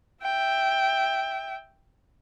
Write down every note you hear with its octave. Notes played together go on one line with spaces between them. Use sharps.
E5 G5